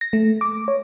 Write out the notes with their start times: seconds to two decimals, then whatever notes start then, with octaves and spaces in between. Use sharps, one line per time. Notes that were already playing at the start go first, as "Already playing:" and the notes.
0.01 A#6
0.13 A3
0.41 D6
0.68 C#5